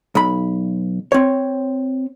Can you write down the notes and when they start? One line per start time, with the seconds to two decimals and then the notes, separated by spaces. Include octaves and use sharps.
0.15 B1 B5
1.12 C4 C#5